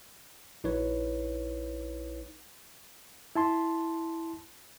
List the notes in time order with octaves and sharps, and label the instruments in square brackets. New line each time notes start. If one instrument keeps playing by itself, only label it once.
[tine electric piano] A#1 D#4 E4 B4 C#5
[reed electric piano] E4 A5 C6